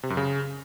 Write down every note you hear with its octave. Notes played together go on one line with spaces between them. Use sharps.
C3
F#2
C#3